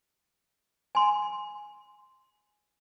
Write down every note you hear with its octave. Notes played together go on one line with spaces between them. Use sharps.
G#5 C6